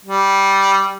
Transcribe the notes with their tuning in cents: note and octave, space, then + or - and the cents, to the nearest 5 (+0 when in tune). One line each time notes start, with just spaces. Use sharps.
G3 -5